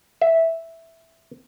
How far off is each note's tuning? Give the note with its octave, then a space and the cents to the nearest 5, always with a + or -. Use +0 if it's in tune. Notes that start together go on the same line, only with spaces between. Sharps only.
E5 -5